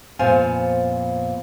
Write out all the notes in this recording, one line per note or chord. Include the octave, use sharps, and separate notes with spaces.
F2 A#2 B3 C5 F5 G#5